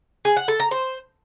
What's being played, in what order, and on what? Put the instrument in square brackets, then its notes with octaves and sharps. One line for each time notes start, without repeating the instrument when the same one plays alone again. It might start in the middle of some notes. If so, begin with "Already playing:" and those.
[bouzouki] G#4
F#5
A4
A#5
C5